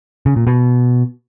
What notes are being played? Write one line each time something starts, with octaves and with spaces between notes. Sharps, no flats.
C#3
A#2
B2